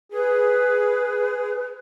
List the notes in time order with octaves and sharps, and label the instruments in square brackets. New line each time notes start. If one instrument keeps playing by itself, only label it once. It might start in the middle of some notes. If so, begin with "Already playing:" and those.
[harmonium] G#4 [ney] B4